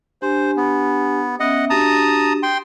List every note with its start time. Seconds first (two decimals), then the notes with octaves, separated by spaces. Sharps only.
0.22 D4 G4 C5 G#5
0.56 B3
1.40 B3 C#4 D#5 E5 F#5
1.70 D4 F#4 G4 A5 A#5 D#6
2.43 G5 C6